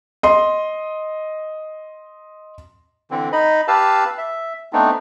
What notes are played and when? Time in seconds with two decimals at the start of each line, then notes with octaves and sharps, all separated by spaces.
0.23 D#5 C6
3.11 D3 E3 C4
3.33 D#4 D#5 B5
3.68 G4 B4 F5 A5 E6
4.18 E5
4.73 A3 B3 C4 D4 D#4